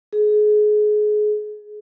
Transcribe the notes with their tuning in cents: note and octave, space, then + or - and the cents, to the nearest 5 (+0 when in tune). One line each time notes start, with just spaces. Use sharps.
G#4 +25